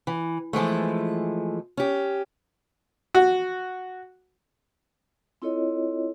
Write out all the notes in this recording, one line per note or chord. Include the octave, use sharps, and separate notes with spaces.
E3
E3 F3 G#3 A3
C#4 G4
F#4
C4 E4 F4 A4 C#5 D#5